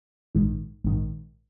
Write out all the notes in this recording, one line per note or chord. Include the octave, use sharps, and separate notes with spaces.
A#1 G#2 D#3
A#1 G#2 D#3